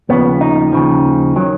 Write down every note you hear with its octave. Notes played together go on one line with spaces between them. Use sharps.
D#2 C#3 F3 B3
D#4
D#2 C#3 F3
D#3 F#3